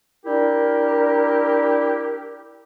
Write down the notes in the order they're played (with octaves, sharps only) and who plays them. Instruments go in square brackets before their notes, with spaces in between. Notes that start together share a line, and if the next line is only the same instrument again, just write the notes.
[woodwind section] D4 E4 G4 A#4